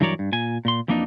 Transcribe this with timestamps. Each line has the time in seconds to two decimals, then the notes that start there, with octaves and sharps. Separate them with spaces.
0.01 G2 E3 F#3 A#4 C#5 D5
0.19 G2
0.32 A#2 G#5
0.65 A#2 C6
0.88 F2 E3 A#3 D4 D#4